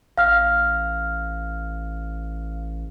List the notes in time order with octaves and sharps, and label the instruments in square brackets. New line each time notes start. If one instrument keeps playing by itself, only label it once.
[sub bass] A1 [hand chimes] F5 F6